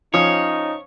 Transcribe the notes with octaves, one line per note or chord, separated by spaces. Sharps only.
F3 C#4 D#4 C#5 D#6